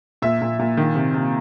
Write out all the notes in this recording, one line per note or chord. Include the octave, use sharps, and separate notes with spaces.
A#2 E5
A#2
A#2
D#3
C3
C3